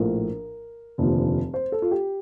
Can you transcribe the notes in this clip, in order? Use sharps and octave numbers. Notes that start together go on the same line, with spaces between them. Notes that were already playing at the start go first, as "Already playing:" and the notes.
Already playing: A#1 A2 F3 A#4
F1 D#2 D3 F3
C5
A4
F4
G4